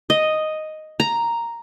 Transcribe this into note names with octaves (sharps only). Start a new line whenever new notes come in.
D#5
A#5